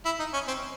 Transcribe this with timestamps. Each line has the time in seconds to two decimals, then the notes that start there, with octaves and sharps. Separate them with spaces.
0.05 E4
0.19 D#4
0.33 C#4
0.47 C4